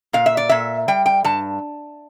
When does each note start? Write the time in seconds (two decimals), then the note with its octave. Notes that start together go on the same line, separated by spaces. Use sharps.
0.13 A#2 F5
0.26 E5
0.37 D5
0.49 A#2 E5
0.88 G3 G5
1.06 G5
1.24 G2 A5